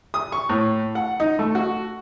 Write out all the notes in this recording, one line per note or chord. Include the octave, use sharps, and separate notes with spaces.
D#6
C#6
A2
F#5
D#4
A3
F#4